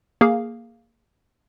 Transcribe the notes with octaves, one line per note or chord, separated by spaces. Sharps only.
A#3 G#4 F5